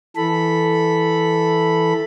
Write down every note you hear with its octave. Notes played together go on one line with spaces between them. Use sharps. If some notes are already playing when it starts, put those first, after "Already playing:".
E3 A4 B5